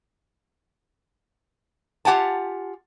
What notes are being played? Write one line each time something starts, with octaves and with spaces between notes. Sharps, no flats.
F4 G4 F#5 G#5 A5